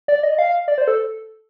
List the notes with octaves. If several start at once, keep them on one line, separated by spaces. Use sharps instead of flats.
D5
D#5
F5
D5
C5
A4